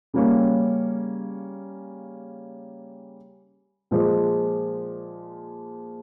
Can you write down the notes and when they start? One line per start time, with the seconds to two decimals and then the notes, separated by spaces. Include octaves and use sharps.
0.14 C#3 G3 A#3 C#4
3.91 A#2 F3 G#3